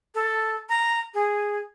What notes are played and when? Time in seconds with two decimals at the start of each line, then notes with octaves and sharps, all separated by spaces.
0.15 A4
0.69 A#5
1.14 G#4